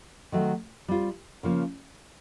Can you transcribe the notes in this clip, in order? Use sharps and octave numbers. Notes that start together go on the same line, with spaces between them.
D#3 F#3 A3 C4
G3 C4 F4
C#3 F3 A#3